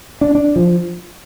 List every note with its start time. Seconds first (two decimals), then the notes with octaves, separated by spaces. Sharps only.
0.21 D4
0.35 D4
0.56 F3